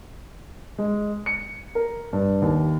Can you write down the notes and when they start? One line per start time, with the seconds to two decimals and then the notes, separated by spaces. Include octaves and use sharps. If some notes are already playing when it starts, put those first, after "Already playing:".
0.78 G#3
1.26 C#7
1.75 A#4
2.13 G2
2.42 D#2